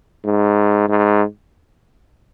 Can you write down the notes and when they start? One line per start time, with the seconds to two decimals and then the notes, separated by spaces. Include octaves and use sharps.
0.25 G#2
0.89 G#2